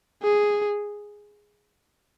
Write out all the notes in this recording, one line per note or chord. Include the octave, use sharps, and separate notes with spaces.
G#4